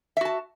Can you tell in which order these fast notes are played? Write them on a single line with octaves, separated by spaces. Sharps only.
E5 F#4 A5